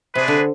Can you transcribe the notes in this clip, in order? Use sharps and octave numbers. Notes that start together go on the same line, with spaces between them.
C3 D4 G#4 B4
D3